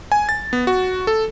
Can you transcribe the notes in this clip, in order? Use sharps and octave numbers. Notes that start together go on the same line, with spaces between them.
G#5
A6
B3
F#4
A4